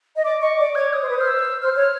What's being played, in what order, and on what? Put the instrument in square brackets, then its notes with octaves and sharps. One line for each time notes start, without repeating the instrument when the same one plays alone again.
[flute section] D#5
[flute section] D5 [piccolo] D6
[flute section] D#5 [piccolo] C#6
[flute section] D5 [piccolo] D6
[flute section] C#5 [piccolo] G#6
[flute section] C#5 [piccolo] D#6
[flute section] C5
B4
[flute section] C5 [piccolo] F6
[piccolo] E6
[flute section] C5 [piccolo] F6
[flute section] C#5